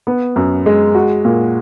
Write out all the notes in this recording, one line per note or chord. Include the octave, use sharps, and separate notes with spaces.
B3
F#2
G#3
F#4
A#2